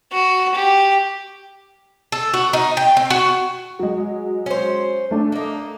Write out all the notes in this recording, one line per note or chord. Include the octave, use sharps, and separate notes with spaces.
F#4
G4
A4
F#4
D#4
G5
C4
F#4
F#3 G#3
C#4 C5
A3 D4
A#3 D#4